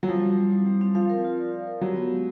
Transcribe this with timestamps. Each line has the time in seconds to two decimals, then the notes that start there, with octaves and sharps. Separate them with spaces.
0.03 F#3
0.08 F3 G3
0.23 C4
0.38 G3
0.52 E4
0.66 G3
0.81 C4
0.95 F3 F5
1.10 A#4
1.24 F4
1.39 D5
1.52 F5
1.67 A#4
1.81 F#3 G4
1.96 B3
2.10 G#3